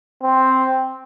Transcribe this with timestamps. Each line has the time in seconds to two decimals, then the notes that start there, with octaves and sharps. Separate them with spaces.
0.23 C4